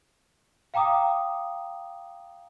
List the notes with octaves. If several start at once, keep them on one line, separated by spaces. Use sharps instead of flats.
F5 G5 A#5 D6 D#6